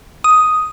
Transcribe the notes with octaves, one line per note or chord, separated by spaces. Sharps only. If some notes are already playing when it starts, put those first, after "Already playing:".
D#6